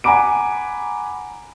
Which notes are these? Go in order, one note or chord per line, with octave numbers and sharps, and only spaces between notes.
F#5 G#5 A#5 B5 D6 D7